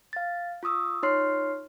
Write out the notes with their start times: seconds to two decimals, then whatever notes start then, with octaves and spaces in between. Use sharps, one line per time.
0.13 F5 A6
0.63 F4 C#6 D#6 E6
1.03 D#4 F4 C#5 C6 F6 C7